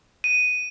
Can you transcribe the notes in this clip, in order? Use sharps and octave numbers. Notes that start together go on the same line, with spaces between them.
D#7